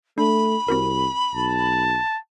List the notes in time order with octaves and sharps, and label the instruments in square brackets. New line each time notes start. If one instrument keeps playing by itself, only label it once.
[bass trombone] A3 [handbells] D4 [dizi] B5
[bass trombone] C2 [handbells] C4 F#4 A#4
[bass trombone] B1 [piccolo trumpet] A5